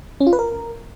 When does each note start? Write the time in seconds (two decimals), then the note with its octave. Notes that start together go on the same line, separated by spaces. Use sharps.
0.20 C#4
0.27 F4
0.33 B4
0.39 A#4